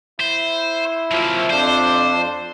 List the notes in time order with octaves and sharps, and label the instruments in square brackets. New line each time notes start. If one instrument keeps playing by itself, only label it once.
[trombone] E4 [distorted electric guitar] C5
[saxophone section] F3 C4 E5 [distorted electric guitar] F#3 A#3
[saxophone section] F2 [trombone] D4 [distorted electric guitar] C5